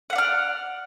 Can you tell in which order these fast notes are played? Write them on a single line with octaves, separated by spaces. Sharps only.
F#5 F5 D5 F6